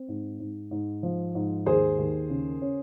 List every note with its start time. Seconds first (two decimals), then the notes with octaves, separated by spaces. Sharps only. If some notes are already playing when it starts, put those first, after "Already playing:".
Already playing: C4
0.08 G#2
0.40 G#2
0.71 G#2
1.03 F3
1.35 G#2
1.66 D#2 G#4 C5
1.99 D#2
2.29 C#3
2.62 C#4